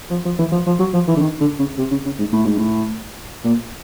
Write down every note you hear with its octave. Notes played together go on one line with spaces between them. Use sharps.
F3
F3
E3
F3
F3
F#3
F3
E3
D3
D#3
D3
C#3
C3
C#3
C#3
G#2
A2
G#2
A2
A#2